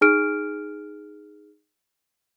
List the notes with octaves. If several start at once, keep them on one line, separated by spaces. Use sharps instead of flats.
D#4 G#4 F6 D7